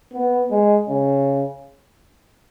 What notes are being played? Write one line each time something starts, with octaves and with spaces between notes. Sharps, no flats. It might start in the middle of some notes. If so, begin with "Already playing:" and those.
B3
G#3
C#3